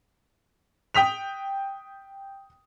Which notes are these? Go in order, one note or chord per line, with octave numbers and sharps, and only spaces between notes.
G5 D#6 B6 F7